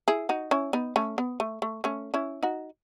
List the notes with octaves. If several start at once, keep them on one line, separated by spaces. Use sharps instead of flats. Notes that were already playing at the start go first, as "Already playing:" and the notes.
E4 G#4
D#4 F#4
C#4 E4
B3 D#4
A3 C#4
B3
A3
A3
A3 C#4
C#4 E4
D#4 F#4